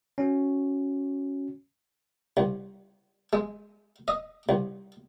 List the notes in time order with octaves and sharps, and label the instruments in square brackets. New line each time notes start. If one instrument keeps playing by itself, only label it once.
[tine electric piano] C#4 F#4
[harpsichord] C2
G#3
D#5
C2